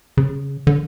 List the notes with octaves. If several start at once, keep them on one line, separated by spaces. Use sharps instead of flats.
C#3
D3